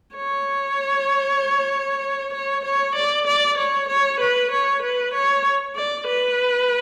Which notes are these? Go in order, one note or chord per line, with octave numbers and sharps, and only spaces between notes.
C#5
C#5
C#5
D5
D5
C#5
C#5
B4
C#5
B4
C#5
D5
B4